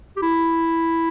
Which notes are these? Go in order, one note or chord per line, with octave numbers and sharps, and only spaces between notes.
G4
E4